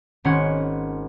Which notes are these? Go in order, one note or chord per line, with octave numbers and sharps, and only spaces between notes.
G#1 C#4 F#5 C6 G#6